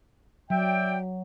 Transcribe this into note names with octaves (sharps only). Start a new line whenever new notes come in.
F#3 D5 E5 G5